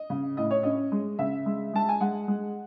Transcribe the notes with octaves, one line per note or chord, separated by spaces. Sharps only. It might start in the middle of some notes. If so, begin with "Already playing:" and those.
Already playing: D#5
C#3
A2 D#5
C#5
C#4 D#5
G#3
C#3 E5
G#3
G#3 A5
G#5
G#3 F#5
G#3